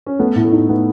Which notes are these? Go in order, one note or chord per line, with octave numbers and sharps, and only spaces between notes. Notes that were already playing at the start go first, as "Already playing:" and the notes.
C#4
A3 B3
A2
A3
D#4
A3 B3